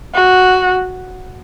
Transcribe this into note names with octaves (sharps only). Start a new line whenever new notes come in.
F#4